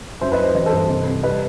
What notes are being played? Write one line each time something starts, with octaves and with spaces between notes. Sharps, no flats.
F#2 C5 E5
B4 D#5
F#3
C5
E3 D#5
A4 C5
G2
C3
C2
G3 B4 D#5